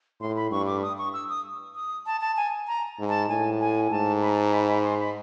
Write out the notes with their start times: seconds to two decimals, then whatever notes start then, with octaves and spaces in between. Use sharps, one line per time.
0.21 A2 C6
0.36 B5
0.51 G2 C#6
0.67 D6
0.82 D#6
0.98 C#6
1.13 E6
1.29 D#6
1.75 D#6
2.06 A5
2.21 A5
2.37 G#5
2.68 A#5
2.99 G#2
3.09 A5
3.29 A2 G#5
3.60 G#5
3.91 G#2 A5
4.22 B5
4.29 A#5
4.36 A5
4.44 A#5
4.53 B5
4.68 B5
4.84 C6
4.99 B5